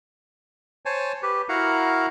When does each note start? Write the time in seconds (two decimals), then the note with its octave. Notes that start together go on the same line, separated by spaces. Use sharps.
0.86 C5 C#5 G#5 A5
1.23 G4 B4
1.49 E4 F#4 A#4 F5 F#5 A#5